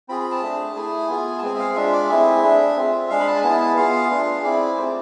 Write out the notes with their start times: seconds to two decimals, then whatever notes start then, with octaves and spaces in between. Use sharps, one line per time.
0.09 C4 F4 G#4 B5
0.20 B5
0.31 A5
0.42 A3 D4 G#4
0.76 A3 E4 G#4 G#5
1.09 B3 F4 G#4
1.38 A5
1.42 G#3 C4 G#4 G#5
1.55 E5
1.60 F5
1.76 G#3 D4 F4 E5
1.93 D5
2.09 A3 C4 E4 G#4 E5
2.43 A3 D4 G#4
2.76 C4 F4 G#4
3.10 G#3 D4 G#4 F5
3.20 B5
3.27 A5
3.36 G#5
3.43 B3 E4 G#4 A5
3.60 A5
3.77 B3 F4 G#4 F5
4.10 A3 D4 F4 G#4
4.44 C4 E4 G#4 D5
4.78 A3 C4 F4 C5